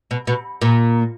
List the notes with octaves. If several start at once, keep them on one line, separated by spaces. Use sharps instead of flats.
B2
B2
A#2